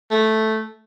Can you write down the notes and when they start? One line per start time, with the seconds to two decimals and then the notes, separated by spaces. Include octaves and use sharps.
0.11 A3